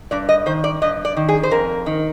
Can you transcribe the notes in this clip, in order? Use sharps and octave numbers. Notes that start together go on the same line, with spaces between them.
G2 D5
D#5
D#3 C5
D5
G2 D#5
D5
D#3
G#4
C5
F2 A#4
D#3